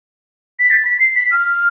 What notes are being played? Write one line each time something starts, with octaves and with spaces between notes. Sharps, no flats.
B6
A6
B6
C7
B6
F6